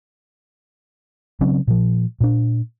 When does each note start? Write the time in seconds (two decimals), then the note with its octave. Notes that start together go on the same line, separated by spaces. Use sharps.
1.41 C#3 F#3 C4 C#4
1.67 A#2 F3
2.21 A#2 D4